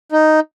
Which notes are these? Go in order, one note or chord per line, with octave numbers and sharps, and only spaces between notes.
D#4